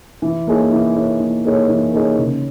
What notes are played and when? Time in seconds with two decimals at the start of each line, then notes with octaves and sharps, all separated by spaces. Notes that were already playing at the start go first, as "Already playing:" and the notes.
0.22 E3
0.47 A#3 D#4 G#4 C#5
0.72 E3
0.95 A#3 D#4 G#4 C#5
1.20 E3
1.44 A#3 D#4 G#4 C#5
1.69 E3
1.93 A#3 D#4 G#4 C#5
2.18 C#3